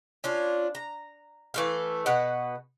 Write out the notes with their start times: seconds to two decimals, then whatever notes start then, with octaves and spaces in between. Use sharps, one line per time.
0.24 C#4 D4 F4
0.75 A#5
1.54 E3 A3 F5
2.06 B2 B4 F#5